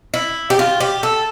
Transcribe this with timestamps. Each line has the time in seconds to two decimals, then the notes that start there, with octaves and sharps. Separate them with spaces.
0.14 E4
0.50 G4
0.59 F4
0.80 G4
1.03 A4